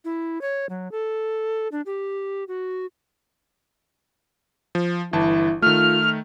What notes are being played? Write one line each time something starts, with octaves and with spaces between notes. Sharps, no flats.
E4
C#5
F#3
A4
D4
G4
F#4
F3
G1 E3 E4 A5
D#3 A3 F4 F6